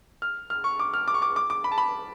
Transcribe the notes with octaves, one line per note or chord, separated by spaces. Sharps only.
F6
F6
C#6
D6
F6
D6
C#6
D6
D6
D6
B5
A5
B5